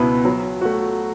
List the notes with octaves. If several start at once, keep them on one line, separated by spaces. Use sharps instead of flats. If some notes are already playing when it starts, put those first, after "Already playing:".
Already playing: C#2 B2 B3 E4 B4
F#3
A3 F#4